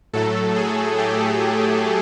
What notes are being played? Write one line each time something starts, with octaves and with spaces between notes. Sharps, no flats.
A2 F#3 A3 A4
G#4
G4